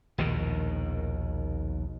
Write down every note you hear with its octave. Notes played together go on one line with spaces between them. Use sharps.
A#1 D#2 B2 D#3